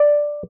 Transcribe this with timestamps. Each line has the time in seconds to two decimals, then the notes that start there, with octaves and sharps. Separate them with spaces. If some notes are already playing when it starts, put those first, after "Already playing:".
Already playing: D5